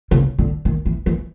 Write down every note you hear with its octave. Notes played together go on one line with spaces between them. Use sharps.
C#3
D3
D#3
E3
E3